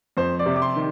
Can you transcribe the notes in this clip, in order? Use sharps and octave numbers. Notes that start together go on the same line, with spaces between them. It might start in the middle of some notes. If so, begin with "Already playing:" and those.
F2 C5
D5
C3
D6
C6
D#3